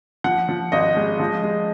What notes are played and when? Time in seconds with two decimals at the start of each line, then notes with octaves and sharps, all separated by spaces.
0.24 F3 F#5
0.49 F3
0.72 G#1 D#5
0.96 G#3
1.20 F3
1.43 G#3